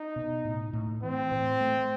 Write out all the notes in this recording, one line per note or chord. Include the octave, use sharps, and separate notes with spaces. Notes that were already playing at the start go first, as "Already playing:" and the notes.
Already playing: D#4
B2
A2
A2
E3 C4
A2
A3